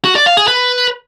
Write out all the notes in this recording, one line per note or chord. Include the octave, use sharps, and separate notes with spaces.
F#4
D5
F5
G#4
B4